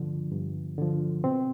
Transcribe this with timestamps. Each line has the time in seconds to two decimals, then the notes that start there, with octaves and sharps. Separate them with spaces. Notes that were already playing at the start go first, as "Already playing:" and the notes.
Already playing: G2 D3 F3 D4
0.31 G2
0.78 D3 F3
1.24 B2 C4